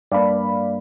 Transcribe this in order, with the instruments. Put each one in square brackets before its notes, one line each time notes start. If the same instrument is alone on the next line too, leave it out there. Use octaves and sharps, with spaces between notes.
[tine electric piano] G2 A#3 [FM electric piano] D5 F5 B5